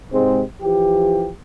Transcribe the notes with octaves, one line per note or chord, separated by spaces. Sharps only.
G#2 C3 G#3 C4
E3 F3 G4